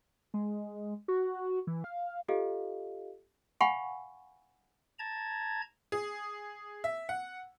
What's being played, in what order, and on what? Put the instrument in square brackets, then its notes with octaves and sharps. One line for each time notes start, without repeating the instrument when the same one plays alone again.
[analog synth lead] G#3
F#4
E3
F5
[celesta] F4 G4 A4 D#5 F5
[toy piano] F5 F#5 G#5 B5 C#6
[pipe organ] A5 A#5 G#6
[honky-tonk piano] G#4
E5
F#5